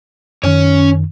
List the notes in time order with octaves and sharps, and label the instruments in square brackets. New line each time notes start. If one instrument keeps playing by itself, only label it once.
[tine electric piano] F#2 D#3 [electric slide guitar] C#4 C#5